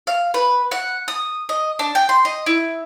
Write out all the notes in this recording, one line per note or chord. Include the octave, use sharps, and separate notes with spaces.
F5
B4
F#5
D#6
D#5
D4
G5
C6
D#5
E4